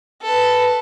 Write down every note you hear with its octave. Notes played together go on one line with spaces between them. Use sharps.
A4 B4